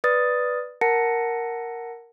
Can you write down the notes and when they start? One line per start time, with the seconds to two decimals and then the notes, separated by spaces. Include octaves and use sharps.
0.04 B4 D5 D#6 A6
0.81 A#4 F#5 A5 A#6 C#7